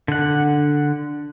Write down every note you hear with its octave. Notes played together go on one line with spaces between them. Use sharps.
D3 F#5